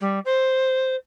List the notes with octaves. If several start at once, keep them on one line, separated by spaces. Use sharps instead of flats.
G3
C5